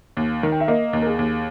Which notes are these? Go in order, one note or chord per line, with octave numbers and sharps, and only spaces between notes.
D#2
D#3
G5
E5
A#3 D#5
D#2
A#4
G#4
D#2